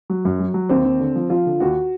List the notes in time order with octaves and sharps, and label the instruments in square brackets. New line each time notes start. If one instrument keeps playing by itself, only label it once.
[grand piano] F#3
F#2
F#3
F#3
[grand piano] D#2 [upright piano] C4
[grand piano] D#2
D3
F3
[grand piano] F3 [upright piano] F4
[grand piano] D3
[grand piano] D#2 [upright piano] F#4